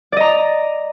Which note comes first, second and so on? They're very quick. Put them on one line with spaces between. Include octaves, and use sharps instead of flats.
D5 D#5 A#5